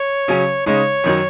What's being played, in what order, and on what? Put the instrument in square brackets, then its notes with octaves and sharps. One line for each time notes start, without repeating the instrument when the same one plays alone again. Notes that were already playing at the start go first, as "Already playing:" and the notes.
Already playing: [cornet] C#5
[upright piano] C#3 F#3 C#4
[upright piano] C#3 G#3 D#4 [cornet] C#5
[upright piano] F#2 D#3 F#3